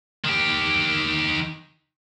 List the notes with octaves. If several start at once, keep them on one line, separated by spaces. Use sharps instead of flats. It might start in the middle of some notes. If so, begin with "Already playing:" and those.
D#3 G4